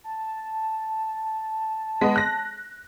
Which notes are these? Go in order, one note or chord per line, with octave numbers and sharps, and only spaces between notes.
A5
G#3 B3 D#5
F#6 A#6